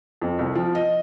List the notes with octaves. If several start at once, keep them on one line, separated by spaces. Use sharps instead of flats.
F2
C2
F3
D#5